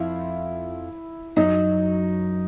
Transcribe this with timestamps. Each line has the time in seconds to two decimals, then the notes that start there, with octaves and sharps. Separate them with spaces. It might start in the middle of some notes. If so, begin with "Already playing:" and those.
Already playing: F2 F3 E4
1.36 F#2 F#3 D#4